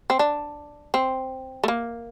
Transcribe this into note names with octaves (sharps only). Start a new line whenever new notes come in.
C4
D4
C4
A3
A#3